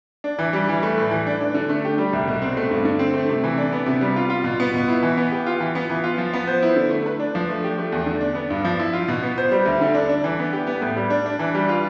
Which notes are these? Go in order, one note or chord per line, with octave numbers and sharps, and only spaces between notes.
D4
E3
G3
E3
A3
A2
E3
D4
D4
D3
A3
G4
G3
C2
B2
C4
A3
G2
D3
C4
A3
C3
E3
D4
B3
C3
G3
F4
F4
B2
B3
B2
E4
E3
B3
G4
F4
E3
B3
E3
F4
F3
B3
C5
E4
D3
A3
B4
D4
F3
A3
G4
A3
E2
D3
D4
B3
G2
F3
E4
F4
B2
B3
C5
G3
D2
D3
D4
D4
E3
B3
G4
B3
A2
G3
D4
D4
E3
G3
F4